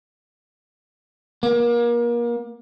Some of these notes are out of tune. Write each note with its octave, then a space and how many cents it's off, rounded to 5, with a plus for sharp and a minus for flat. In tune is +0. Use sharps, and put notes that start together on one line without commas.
A#3 +30